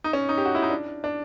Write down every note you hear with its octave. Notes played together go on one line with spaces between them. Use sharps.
D#4
C#4
D#4
G4
F#4
E4
D#4
D4
D4